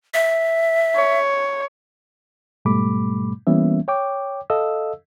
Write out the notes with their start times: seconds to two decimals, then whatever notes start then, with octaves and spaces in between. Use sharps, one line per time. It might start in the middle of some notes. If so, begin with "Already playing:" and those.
0.14 E5
0.96 C#5
2.65 G#2 B2 G3 A3 B5 D6
3.47 E3 G3 A#3 B3 C#4 E5
3.88 C#5 G5 D6
4.50 A4 D#5 F5 E6